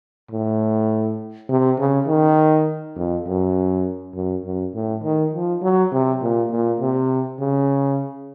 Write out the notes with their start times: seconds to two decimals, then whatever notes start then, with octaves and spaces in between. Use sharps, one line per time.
0.31 A2
1.49 C3
1.79 C#3
2.08 D#3
2.97 F2
3.26 F#2
4.15 F#2
4.44 F#2
4.74 A2
5.04 D#3
5.33 F3
5.62 F#3
5.92 C3
6.22 A#2
6.51 A#2
6.80 C3
7.40 C#3